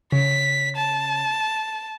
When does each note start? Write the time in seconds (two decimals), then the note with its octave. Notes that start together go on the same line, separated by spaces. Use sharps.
0.12 C#3 B6
0.76 A5